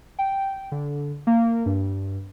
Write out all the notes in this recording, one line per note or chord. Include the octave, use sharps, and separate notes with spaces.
G5
D3
A#3
G2